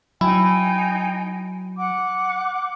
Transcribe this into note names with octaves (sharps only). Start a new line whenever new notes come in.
F#3 D#4 E4 G5 G#5
F#5 D6